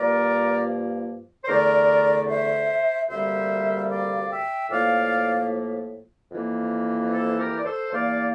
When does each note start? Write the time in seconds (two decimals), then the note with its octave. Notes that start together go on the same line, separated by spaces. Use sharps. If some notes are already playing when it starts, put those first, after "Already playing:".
Already playing: G2 F3 A#3 A#4 D5
1.44 C5
1.48 E2 D3 A3 A#4 D5
2.28 C5 E5
3.09 D2 C3 G3 A#3 C5 E5
3.89 D5 F5
4.29 E5 G5
4.70 A2 F3 A#3 D5 F5
6.32 F2 E3 A#3
7.12 A4 C5
7.38 G4 A#4
7.58 D5
7.65 A4 C5
7.92 E2 E3 A#3 D5 F5